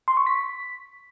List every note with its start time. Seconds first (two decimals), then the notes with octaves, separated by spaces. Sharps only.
0.08 C6
0.17 C#6
0.26 B6